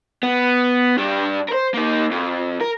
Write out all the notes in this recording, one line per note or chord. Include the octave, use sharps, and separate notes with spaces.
B3
G2 D4
A#4 C5
A#3 D#4
F2
A#4